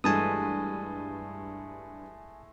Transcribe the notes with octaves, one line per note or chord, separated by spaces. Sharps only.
G2 E3 G#3 A3 G#5 A5 D#6